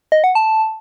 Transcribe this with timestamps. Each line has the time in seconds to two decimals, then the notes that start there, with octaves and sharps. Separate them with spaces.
0.12 D#5
0.24 F#5
0.35 A5